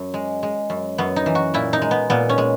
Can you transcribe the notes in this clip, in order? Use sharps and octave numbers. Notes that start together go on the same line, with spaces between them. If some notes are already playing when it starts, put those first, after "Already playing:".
Already playing: F#2
G#3
G#3
F#2
F#2 B3
D#4
E3
F#4
A#2 E4
D#4
G#3
B3
A#2 B3
C#4
G#3